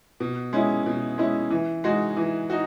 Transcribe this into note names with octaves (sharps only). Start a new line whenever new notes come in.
B2
G#3 C#4 E4
B2
G#3 C#4 E4
E3
G#3 D#4 F#4
E3
D#4 F#4